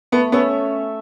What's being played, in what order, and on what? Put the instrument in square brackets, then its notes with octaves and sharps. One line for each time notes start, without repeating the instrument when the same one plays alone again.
[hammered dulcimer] A3 [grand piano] B3
[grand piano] B3 [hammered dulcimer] C#4 A4 E5